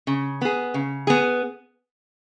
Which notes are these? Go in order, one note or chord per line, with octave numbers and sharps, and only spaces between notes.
C#3
B3 G#4
C#3
B3 G#4